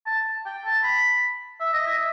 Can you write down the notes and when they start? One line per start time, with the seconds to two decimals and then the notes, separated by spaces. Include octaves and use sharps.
0.06 A5
0.46 G5
0.65 A5
0.83 B5
1.60 E5
1.73 D#5
1.86 E5